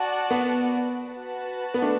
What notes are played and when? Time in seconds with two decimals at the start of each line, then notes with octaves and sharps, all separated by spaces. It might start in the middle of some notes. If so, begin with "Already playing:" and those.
Already playing: F#4 D5 F#5 A5
0.31 B3
1.06 F#4 B4 F#5 A5
1.74 B3
1.82 A3 D4